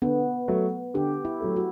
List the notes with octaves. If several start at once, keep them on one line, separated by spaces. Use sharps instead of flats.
D3 B3
F#3 A3
D3 G4
E4
F#3 A3
F#4